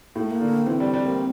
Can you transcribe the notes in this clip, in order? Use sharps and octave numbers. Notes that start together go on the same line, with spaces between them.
A2 A#3
A3
A#3
D3
E3 C4
G3
G3
A#3